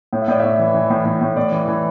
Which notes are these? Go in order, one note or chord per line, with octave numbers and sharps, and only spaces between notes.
A2
E5
A2 D5
A2 E5
E3
E3
A2
A2
A2
A2 D5
E3
E3